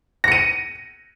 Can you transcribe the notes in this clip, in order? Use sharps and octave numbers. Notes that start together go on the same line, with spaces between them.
A#6 C#7 D#7